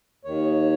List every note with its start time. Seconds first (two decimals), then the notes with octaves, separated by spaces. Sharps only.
0.25 D#2 D#3 C#5